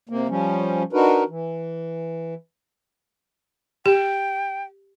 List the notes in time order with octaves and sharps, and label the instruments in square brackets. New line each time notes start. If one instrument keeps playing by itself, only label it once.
[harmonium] C3 A#3
F3 G3 C#4
D4 D#4 F#4 A#4 B4
E3
[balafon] G4 [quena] G5